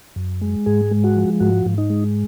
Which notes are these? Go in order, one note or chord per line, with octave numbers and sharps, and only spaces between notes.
F#2
G#3
G#2 G#4
G#3
F#4
F3
G#2 F#4
G#2
D#4
G#3